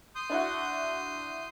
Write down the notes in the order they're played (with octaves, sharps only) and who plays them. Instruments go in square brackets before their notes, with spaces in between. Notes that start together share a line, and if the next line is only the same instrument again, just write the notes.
[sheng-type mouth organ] C6 D#6 G6
[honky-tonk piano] D4 E4 F#4